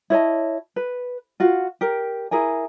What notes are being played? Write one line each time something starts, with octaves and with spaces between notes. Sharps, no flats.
E4 C#5 D#5 A5
B4
F4 F#4 F5
G4 A#4
E4 G#4 A#4 G#5